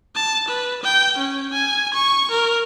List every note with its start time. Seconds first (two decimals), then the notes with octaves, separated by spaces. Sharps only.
0.15 A5
0.48 B4
0.83 G5
1.18 C#4
1.53 G#5
1.94 C#6
2.31 A#4